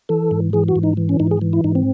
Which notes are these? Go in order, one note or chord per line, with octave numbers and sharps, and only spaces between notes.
E3 A4
G#2
E3 G#4
F#4
G#2
D#4
E3
C#4
G#2 D#4
G#4
E3
E4
G#2 D#4
C4